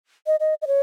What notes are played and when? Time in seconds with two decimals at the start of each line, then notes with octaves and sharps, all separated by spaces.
0.27 D#5
0.40 D#5
0.62 D#5
0.67 C#5